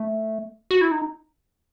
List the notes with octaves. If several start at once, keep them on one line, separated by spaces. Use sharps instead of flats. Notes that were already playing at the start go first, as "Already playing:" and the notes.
Already playing: A3
F#4
E4
D#4